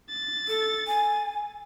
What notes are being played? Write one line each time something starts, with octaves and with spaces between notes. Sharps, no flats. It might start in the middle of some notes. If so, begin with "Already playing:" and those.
A6
A4
G#5